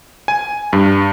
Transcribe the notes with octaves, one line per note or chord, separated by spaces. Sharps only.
G#5
G2